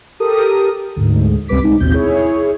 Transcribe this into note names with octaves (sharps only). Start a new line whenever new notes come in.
G4 A4 A#4 D#6
D2 G#2
C#2 C3 G3 B4 D6 B6
G#2 D#4
A1 D#2 B2 C4 G6
E4 G#4 C#5